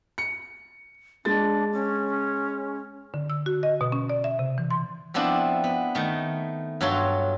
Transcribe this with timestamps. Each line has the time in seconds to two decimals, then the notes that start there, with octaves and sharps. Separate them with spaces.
0.18 C#7
1.25 G#3 D4 A6
1.73 C#4
3.14 D3
3.30 E6
3.46 F#4
3.63 D#5
3.81 B2
3.92 C#4
4.10 D5
4.24 E5
4.39 C3
4.58 E3
4.71 C6
5.14 F3 B3 C4 D4 E4
5.64 B3
5.95 D#3 A3
6.81 G2 F#3 F4 A4 C#5 C6